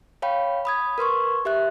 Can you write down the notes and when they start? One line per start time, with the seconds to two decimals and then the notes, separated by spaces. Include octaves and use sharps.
0.22 C#5 F5 G5 B5
0.65 B5 D#6 G#6
0.98 A#4 B4 C6 C#6
1.45 G4 E5 F#6